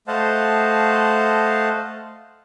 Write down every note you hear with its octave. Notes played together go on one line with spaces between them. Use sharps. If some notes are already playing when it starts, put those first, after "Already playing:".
A3 C5 D#5 F5 F#5 A5